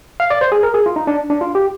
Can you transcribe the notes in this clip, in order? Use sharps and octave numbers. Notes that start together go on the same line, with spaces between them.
F5
D5
C5
G#4
A#4
G#4
F4
D#4
D4
D4
F4
G4